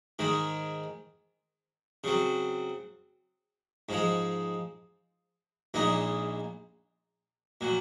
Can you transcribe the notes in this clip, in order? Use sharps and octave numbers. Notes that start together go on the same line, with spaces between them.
G#2 D#3 G#3
C#3 F#3 C4
G#2 F3 G#3
A#1 A#2 G#3 D#4
A#2 F#3